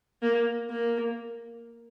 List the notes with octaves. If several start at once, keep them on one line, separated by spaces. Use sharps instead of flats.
A#3
A#3